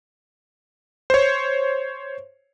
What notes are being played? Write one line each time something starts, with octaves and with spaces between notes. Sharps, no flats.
C5 C#5